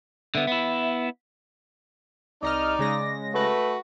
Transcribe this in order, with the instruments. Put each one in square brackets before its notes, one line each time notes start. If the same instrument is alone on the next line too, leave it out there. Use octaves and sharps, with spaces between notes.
[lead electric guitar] D3 B3 [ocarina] E5
[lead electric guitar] B3 E4
[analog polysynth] C2 D#5 F6 [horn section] D#4 [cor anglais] D5
[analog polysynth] C#3 G#3 A#6
[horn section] A3 B4 [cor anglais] F#4